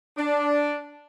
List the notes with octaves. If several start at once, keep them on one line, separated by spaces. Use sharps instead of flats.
D4